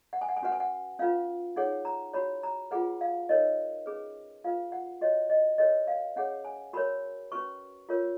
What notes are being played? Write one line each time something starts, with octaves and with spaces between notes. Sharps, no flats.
F#5
G#5
F#5
G#5
C#4 F#4 B4 F#5
G#5
F#5
C#4 F4 B4 F5
D#4 G#4 C#5 F#5
A#5
F#4 C#5 B5
A#5
F4 G#4 B4 F#5
F5
D#4 A#4 C#5 D#5
C#4 G#4 B4
F4 B4 F5
F#5
F#4 C#5 D#5
D#5
F#4 A#4 C#5 D#5
F5
C#4 G#4 C#5 F#5
G#5
F#4 A#4 C#5 B5
C#4 F#4 B4 C#6
F4 A#4 C#5